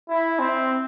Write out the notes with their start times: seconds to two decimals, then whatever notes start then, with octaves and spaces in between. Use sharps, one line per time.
0.09 E4
0.39 C4